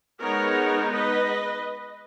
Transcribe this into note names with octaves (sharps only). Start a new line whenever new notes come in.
G#3 B3 D#4 A#4 C#5
B4 D#5